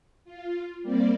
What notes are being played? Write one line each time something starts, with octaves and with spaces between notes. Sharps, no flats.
F4
G3 A#3 C4 D5